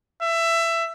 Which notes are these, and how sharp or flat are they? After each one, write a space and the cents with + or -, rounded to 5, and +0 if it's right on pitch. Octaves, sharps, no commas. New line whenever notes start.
E5 +15